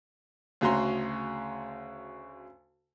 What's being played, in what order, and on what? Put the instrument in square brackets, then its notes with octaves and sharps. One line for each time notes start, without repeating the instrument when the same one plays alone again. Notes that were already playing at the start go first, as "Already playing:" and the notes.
[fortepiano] D2 C#3 F#4 A#5 C6